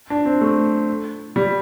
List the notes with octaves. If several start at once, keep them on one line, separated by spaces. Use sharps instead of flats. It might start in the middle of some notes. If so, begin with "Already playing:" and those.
D4
C4
A3
G3